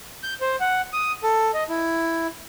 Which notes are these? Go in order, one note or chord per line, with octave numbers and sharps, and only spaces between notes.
G6
C5
F#5
D#6
A4
D#5
E4